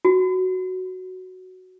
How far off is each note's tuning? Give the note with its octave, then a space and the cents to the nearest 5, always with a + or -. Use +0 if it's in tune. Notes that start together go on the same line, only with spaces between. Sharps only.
F#4 +5